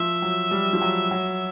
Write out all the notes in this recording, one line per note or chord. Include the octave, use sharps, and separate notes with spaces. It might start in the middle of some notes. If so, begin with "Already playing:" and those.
Already playing: F3 E5
F#3
G3
F3
F#3
F#3